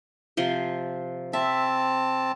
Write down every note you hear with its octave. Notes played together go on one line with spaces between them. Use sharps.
C3 F3 C5
C4 E5 A5